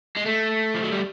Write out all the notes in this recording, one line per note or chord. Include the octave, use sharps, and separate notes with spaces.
G#3
A3
F3
F#3
G3